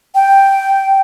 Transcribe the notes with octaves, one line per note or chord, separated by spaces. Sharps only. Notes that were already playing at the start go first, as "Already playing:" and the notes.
G5